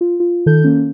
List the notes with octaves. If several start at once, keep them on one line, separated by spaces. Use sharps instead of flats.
F4
F4
D#3 A4 G6
A#3 C#4